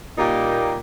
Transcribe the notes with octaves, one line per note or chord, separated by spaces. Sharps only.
A#2 G3 A#3 D#4 G4